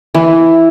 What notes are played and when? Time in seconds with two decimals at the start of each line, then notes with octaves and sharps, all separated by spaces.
0.15 E3